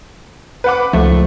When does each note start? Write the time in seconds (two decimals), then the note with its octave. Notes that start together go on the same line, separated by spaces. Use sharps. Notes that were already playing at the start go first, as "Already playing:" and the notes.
0.64 B4 F#5 D6
0.93 C#2 F3 A3